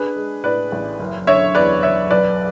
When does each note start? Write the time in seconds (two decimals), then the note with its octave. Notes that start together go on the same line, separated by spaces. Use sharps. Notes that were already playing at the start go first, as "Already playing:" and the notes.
Already playing: D4 G#4 B4
0.16 G#3
0.44 A2 B4 D5
0.72 A1
1.00 F#1
1.27 D3 C#5 E5
1.55 E2 B4 D5
1.83 F#1 C#5 E5
2.11 B1 B4 D5